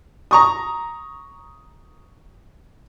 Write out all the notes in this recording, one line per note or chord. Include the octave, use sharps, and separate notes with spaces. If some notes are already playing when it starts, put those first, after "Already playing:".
A#5 C#6 D#6